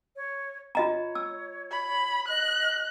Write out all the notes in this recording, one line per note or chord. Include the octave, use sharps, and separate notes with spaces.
C#5
F4 C#5 D#5 A#5
E6
B5
D#5 F#6